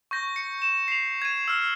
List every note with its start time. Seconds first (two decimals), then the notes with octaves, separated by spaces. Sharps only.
0.11 C#6 G6 A#6
0.36 C#7
0.62 E7
0.88 C7 F7
1.22 G#6 D#7
1.48 E6 F6